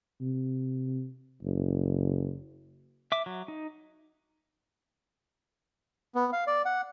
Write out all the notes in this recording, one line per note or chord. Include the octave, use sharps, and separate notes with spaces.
C3
F#1
E5 D6
F#3
D#4
B3
F5
D5
F#5